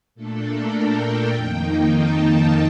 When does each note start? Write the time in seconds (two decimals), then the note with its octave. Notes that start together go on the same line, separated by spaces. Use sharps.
0.15 A#2 A3 D4 A4
0.45 A#4
0.74 G5
1.33 F2 D#3 A#3 D#4
1.93 A5